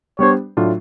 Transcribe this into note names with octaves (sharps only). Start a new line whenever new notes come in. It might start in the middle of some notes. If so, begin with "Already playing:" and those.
G3 B3 D4 G4 C5 C#5
A2 F#3 A3 D4 F4